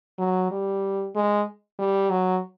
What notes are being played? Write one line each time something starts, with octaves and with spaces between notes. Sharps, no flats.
F#3
G3
G#3
G3
F#3